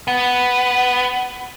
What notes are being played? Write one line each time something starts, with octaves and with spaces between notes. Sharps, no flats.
B3